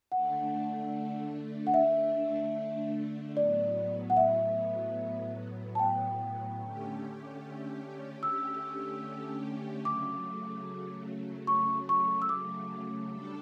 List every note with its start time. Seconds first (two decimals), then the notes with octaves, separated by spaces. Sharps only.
0.11 D3 A3 D4 F#5
1.67 F#5
1.74 E5
3.36 A2 F#3 B3 D5
4.10 F#5
4.17 E5
5.75 A5
5.79 G5
6.61 D3 A3 C#4 G4
8.23 E6
9.85 C#3 F#3 A3 D6
11.47 C#6
11.89 C#6
12.22 E6
12.29 D6
13.10 G3 D4 A4